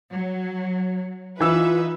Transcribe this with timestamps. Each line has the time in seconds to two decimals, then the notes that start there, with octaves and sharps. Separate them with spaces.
0.13 F#3
1.40 E3 D#4 F4 B4 E5 E6